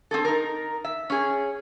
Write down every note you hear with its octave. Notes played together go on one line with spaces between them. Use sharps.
C4 G#4 A4
D#4 A#4
E5
C#4 G#4